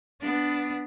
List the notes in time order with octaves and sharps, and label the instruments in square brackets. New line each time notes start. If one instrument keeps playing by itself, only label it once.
[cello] B3 D4